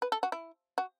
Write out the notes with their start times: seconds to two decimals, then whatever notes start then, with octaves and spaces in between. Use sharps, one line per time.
0.02 B4
0.12 A4
0.23 F#4
0.32 E4
0.78 F#4